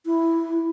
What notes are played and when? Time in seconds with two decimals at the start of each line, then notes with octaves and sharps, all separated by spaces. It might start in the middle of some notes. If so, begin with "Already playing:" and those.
0.06 E4